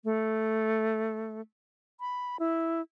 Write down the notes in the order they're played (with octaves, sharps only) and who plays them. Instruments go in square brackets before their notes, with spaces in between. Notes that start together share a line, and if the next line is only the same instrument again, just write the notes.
[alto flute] A3
B5
E4